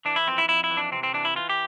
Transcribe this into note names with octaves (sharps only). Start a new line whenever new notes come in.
E3 D4
E4
F2 C4
E4
F2 E4
E4
E3
D4
C3 C4
C4
E3 D4
E4
E3 F4
G4